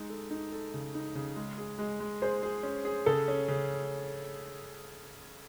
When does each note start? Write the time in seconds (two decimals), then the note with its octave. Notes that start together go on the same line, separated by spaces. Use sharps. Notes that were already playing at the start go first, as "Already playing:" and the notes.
Already playing: G#3 D#4
0.10 A4
0.30 D#4
0.52 A4
0.74 C#3
0.95 D#4
1.15 C#3
1.36 G#3
1.58 G#4
1.79 G#3
2.00 G#3
2.22 G#4 C5
2.43 G#4
2.63 C#4
2.85 G#4
3.06 C#3 A4
3.28 C#4
3.48 C#3